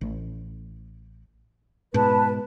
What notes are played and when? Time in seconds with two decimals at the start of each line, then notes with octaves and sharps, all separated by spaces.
0.01 A1
1.94 G#2 B2 B4 A5